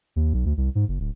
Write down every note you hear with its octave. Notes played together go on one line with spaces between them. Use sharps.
D#2
B1
D2
C2
G#2
F#1
D1